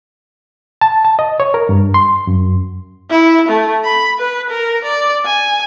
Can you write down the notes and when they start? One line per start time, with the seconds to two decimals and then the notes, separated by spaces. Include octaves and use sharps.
0.81 A5
1.05 A5
1.19 D#5
1.40 C#5
1.54 A#4
1.69 G2
1.94 C6
2.27 F#2
3.10 E4
3.48 A3
3.84 B5
4.19 B4
4.50 A#4
4.84 D5
5.26 G#5